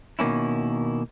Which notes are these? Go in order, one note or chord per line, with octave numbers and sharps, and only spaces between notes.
B2 D#3 A#3 C#4 E4